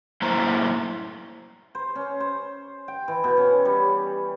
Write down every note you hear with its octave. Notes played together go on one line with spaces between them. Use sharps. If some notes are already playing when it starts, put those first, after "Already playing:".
F#2 A2 A#3 E4 C5 A#5
C5
C#4
C5
G5
E3
B2
C#4
G3